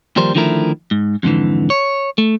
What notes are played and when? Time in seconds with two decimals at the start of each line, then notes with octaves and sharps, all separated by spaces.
0.16 D#2 F3 G3 A#4 C5
0.35 D3 D#3 F3 A3 E4 A#4
0.91 G#2
1.23 F2 G#2 D3 E3
1.70 C#5
2.18 A3